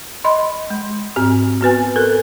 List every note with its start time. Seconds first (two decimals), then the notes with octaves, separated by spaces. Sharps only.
0.24 D#5 B5 C6
0.70 G#3
1.16 G#2 C4 G4
1.61 B3 F#4 B4 G#5
1.96 A4 A#4 F#6